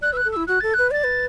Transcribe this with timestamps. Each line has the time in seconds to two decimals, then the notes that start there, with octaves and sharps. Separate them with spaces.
0.01 D5 F#6
0.13 B4 E6
0.17 F#6
0.25 A4
0.32 E4 E6
0.47 F#4 F#6
0.60 A4 A6
0.74 B4 F#6
0.91 D5 A6
1.04 B4